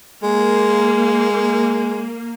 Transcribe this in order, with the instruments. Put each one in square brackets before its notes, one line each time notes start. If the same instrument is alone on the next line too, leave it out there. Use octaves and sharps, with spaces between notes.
[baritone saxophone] G#3 [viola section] A#3